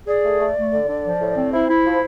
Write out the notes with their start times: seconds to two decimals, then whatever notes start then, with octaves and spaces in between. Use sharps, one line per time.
0.07 G#4 D5
0.24 A3
0.40 A3
0.56 A3
0.73 D3
0.88 D3
1.05 F3
1.20 A2
1.36 C4
1.52 E4 C5
1.68 E4
1.85 F3